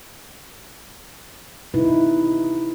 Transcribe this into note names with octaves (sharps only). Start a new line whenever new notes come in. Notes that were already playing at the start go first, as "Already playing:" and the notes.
C3 D#4 E4 B4